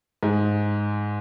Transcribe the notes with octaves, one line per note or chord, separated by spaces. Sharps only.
G#2 G#3